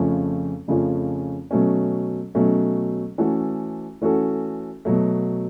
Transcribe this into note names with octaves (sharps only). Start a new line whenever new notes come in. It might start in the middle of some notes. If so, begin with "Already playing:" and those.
Already playing: F2 C#3 F3 A3 C#4
F2 C#3 F3 A3 C#4
B2 F#3 A3 C#4
B2 F#3 A3 C#4
E3 A3 C#4 F#4 A4
E3 A3 C#4 F#4 A4
B2 F#3 A3